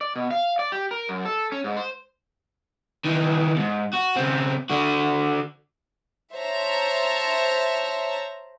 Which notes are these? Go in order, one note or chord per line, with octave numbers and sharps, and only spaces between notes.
D5
B2
F5
D5
G4
A#4
F#2
A4
C#4
G#2
C5
D#3 E3
D#2 G#2
F#4
C#3 C4
D3 F#4
C5 C#5 E5 A5 A#5